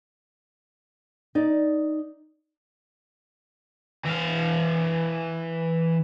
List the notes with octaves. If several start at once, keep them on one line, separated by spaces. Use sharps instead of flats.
D#4 D5
E3 F5